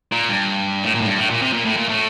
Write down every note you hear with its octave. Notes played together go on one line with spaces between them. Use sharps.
A#2
G2
A2
A#2
A2
G2
A2
A#2
C3
A#2
A2
A#2
A2